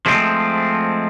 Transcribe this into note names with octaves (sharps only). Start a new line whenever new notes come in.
F3 G#3 A3 C4